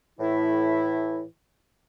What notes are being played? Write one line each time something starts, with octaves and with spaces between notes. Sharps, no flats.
A2 E3 E4